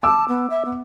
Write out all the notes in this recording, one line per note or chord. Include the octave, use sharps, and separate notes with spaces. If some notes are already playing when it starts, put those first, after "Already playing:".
A5 D6 E6
B3
E5
B3